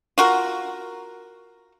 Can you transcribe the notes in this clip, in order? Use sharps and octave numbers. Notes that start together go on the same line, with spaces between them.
F4 F#4 A#4